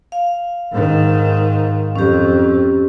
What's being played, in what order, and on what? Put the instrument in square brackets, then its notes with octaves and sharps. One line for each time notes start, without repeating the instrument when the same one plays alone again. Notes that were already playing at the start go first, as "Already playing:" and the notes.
[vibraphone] F5
[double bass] G#2 D#3
[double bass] F2 [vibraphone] C#4 G4